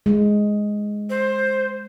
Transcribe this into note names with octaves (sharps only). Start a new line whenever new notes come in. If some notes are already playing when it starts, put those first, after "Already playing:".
G#3
C5